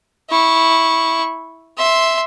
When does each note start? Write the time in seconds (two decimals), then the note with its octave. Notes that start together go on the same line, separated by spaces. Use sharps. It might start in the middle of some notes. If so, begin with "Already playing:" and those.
0.30 E4 C#6
1.78 E5 C6